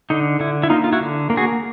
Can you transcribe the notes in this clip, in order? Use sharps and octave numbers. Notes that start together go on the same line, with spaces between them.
D3 D#4
D3 E4
E4
A#3 D#4 F4
F4
E4 F#4
D3
A#3
F#4 G#4